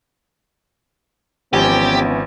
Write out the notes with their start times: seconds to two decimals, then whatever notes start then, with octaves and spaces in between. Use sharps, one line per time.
1.53 G#1 E3 F3 B3 C#4 G4 G#5